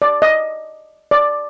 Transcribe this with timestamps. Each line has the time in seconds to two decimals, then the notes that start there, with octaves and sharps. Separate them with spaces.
0.02 D5
0.22 D#5
1.11 D5